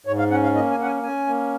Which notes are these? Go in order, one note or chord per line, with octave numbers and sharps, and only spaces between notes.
G#2 C#5
F5
C#4 F#5
F5
A#3 D#5
G#5
C#4 F#5
G#5
C#4 G#5
A#3